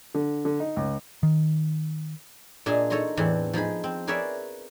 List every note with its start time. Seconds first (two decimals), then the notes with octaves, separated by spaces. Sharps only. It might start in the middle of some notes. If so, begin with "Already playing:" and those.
0.14 D3
0.45 D3
0.60 D#4
0.76 C#2
1.23 D#3
2.66 A#2 D4 G#4 D#5 E5 A#5
2.90 D#4 A4 C#5 D#5 A#5 C6
3.17 E2 A2 E3 C4 D4 F#5
3.53 F3 D#4 G#4 B5
3.84 C4
4.07 G#4 A#4 B4 C#5 D5 E5